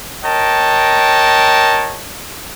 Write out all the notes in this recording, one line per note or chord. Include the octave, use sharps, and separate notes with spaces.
A#4 C#5 D#5 G5 A5